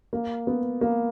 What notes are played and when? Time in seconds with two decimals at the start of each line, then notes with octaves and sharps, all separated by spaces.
0.13 A#3
0.47 B3
0.81 A#3